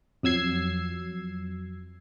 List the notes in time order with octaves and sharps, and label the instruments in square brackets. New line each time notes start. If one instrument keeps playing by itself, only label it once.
[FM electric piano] F2 F#3 E6 G#6 C7